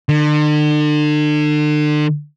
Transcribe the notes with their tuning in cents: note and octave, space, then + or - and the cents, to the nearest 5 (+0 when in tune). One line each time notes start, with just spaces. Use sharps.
D3 +40